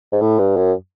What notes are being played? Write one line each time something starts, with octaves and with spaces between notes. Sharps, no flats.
G#2
A2
G2
F#2